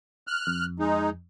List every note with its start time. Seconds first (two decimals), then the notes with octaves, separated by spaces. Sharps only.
0.27 F6 F#6
0.47 F2
0.80 G#3 D#4